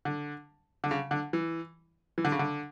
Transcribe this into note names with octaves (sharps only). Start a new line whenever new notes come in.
D3
D3
C#3
D3
E3
E3
D3
C#3
D3